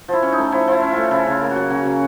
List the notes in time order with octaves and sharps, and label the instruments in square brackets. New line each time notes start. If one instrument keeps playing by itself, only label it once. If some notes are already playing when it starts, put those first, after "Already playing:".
[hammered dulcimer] F3 E4
C#4
D#4
A3
F3 E4
F3 E4
C#4
A3 F4
C#3 E4
C#3 F4
A#3
F#4
F#3
C#3 F#4
C#3